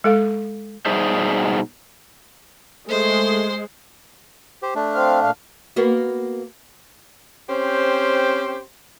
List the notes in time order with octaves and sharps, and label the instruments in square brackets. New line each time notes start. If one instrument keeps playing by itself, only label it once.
[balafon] G#3 A4 F5
[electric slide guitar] B2 G3 D#4 G#4 C5 E5
[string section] G#3 [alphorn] A3 [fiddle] C5 C6
[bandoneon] G4 C5
A3 D4
[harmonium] C4 F5
A#2 F5
[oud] A#3 B3 F#4
[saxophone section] C4 C#4 G4 C5